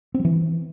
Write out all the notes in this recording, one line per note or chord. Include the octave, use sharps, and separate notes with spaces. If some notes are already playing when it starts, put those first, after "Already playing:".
C4
F#3
E3